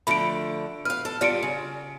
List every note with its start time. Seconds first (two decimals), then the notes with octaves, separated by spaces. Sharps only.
0.07 D3 F3 A3 B5 D7
0.85 B4 F5 F6
1.05 A4
1.21 D3 G3 F4 D5 C#7 D7
1.43 C#3